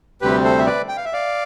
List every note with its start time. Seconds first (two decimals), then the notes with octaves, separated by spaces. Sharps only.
0.22 D2 C3 G3 C4 G4 B4
0.44 A4 C5
0.59 E5
0.66 B4 D5
0.89 G5
0.97 F5
1.05 E5
1.13 D5 F5